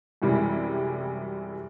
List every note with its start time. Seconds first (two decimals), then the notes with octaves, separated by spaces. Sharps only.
0.22 F#2 C3 E3 G3 G#3